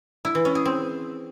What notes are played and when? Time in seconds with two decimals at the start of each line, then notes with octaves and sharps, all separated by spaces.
0.25 E4
0.35 E3
0.45 C#4
0.55 G#4
0.65 C4